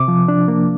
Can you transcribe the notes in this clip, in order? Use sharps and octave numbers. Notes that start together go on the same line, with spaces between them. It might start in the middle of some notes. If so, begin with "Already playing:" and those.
Already playing: C3 D6
F3
D4
A#3